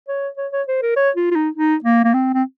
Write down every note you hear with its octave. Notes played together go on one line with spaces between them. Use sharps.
C#5
C#5
C#5
C5
A#4
C#5
F4
F4
D#4
D#4
A#3
A#3
C4
C4